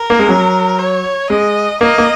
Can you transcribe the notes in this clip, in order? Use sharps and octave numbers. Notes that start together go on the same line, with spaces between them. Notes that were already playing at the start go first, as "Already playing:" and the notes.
Already playing: A#4
A#3
G#3
F#3
C#5
G#3 D#5
A#3 D#5
A#3